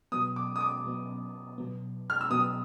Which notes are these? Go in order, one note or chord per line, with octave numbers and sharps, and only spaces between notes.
B2 F#3 B3 D#6
D6
D#6
D6
B2 F#3 B3
B2 F#3 B3
F6
E6
B2 F#3 B3 D#6